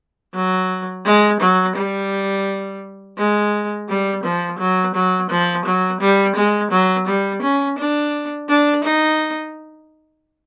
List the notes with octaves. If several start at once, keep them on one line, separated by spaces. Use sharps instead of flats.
F#3
G#3
F#3
G3
G#3
G3
F3
F#3
F#3
F3
F#3
G3
G#3
F#3
G3
C#4
D4
D4
D#4